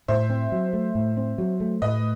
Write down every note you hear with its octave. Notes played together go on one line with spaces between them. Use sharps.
A2 C5 E5
C4
F#3
A3
A2
C4
F#3
A3
A2 B4 D#5